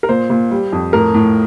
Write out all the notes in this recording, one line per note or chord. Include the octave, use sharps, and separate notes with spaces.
A#4
A#2 C5
A#2
G3
F2
A2 A#4
A2